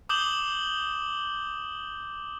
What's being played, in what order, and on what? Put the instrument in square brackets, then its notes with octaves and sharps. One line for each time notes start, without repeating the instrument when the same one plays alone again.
[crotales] D6 D#6 G6 E7 F#7 G7